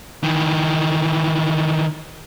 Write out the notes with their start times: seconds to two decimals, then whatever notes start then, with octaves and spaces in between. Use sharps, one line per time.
0.24 D#3 E3